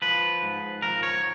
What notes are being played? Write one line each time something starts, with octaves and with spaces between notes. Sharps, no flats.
F3 B4
G#2
F3 A#4
C#5